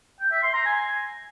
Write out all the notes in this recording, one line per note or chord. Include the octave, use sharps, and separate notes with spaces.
G5
E5
C6
A#5
G#5